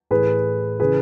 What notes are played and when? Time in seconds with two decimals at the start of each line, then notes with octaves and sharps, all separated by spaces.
0.11 A2 E3 G#4 B4
0.80 C#3 E3 G#4 B4